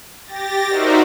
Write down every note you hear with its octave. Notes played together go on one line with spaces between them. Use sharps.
G4 A6 A#6
D#4 F#4 A#4 C5 D5 E5